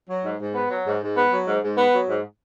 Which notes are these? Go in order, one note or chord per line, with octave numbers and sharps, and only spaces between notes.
F#3
G#2
G#2
B3
F#3
G#2
G#2
B3
F#3
G#2
G#2
B3
F#3
G#2